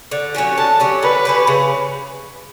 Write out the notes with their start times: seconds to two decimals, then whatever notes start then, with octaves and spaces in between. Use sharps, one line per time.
0.11 D3
0.34 F#3 C#4 G4
0.58 D3 A5
0.80 F#3 C#4 G4
1.02 D3 B4
1.25 F#3 C#4 G4
1.47 C#3